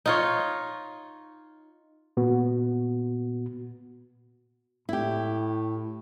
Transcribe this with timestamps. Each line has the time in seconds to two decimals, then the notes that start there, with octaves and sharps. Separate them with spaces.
0.06 D#4 F4 C#5
2.17 A#2 B3 F#4
4.89 A2 E4 G4